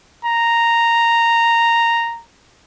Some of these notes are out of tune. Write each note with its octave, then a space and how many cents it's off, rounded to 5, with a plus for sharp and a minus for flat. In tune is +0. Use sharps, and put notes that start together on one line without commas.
A#5 -5